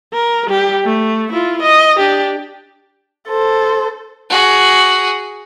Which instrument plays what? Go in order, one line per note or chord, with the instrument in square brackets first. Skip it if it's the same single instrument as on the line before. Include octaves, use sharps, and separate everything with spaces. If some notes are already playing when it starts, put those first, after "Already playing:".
[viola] A#4
G3 G4
A3
E4 F4
D#5
D4 G4
[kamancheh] A4 C5
[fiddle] F#4 G#4